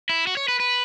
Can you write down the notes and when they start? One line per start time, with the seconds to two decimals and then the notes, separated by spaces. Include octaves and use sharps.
0.09 E4
0.27 F#4
0.37 C#5
0.48 B4
0.60 B4